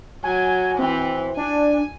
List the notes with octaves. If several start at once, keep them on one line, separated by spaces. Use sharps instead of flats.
F#3 G#5
E3 C4
D4 G#5